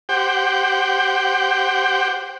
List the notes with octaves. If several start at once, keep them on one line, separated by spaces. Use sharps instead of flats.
G4 C5 F#5 G5